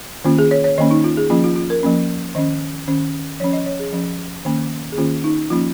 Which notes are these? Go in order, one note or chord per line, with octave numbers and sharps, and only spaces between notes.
D#3 A#3 C#4 F4
G#4
C#5
C#5
D#3 A#3 C#4 D#5
D#4
F4
G#4
F3 A#3 C#4 F4
F4
F4
A#4
F3 A#3 C#4
D#3 C#4 D#5
D#3 C#4
F3 C#4 C#5
D#5
C#5
G#4
F3 C#4
D#3 A#3 C#4
G#4
D#3 A#3 C#4 F4
D#4
F3 A#3 C#4 F4